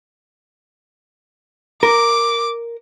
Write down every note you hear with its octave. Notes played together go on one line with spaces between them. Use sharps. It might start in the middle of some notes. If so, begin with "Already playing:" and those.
A#4 D6